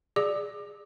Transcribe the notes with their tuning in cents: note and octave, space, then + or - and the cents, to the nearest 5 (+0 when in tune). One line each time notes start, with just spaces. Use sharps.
G#4 -15 D5 +0 D6 +25